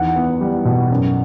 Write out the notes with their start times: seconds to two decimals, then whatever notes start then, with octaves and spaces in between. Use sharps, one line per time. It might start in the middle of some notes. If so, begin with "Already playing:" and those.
Already playing: E2 D#3 F#5
0.16 B3
0.41 G3
0.65 B2
0.91 F#2